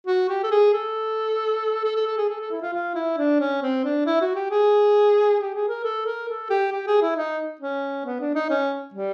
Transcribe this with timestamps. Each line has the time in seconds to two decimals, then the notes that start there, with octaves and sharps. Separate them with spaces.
0.06 F#4
0.29 G4
0.43 A4
0.51 G#4
0.73 A4
1.84 A4
1.95 A4
2.06 A4
2.17 G#4
2.29 A4
2.40 A4
2.51 E4
2.62 F4
2.73 F4
2.95 E4
3.17 D4
3.40 C#4
3.62 C4
3.84 D4
4.06 E4
4.21 F#4
4.35 G4
4.50 G#4
5.39 G4
5.54 G#4
5.68 A#4
5.84 A4
6.05 A#4
6.28 A4
6.50 G4
6.72 G4
6.87 G#4
7.02 E4
7.16 D#4
7.61 C#4
8.05 B3
8.20 D4
8.35 D#4
8.50 C#4
8.94 G3